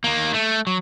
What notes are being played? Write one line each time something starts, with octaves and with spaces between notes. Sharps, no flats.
D#3 A#3
A3
F#3